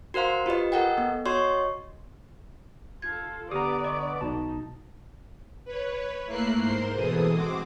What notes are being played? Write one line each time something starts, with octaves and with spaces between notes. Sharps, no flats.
F#4 A#4 C5 F5 C6
F4 G4 B4 D#5
A4 A#4 D#5 F#5 G5
B3
F#4 C#5 D#5 C6 C#6
F4 A4 G#6
D3 B3 G4 D5 A#5 D#6
D#5 C#6
B1 B2 D#4 A5
B4 C#5
A3 A#3 E4 A#4 F#6 C7
G#2 A#4 C5 C6
B2 E3 G#4 A4 D#6
G#3 C4 F#4 C5 D6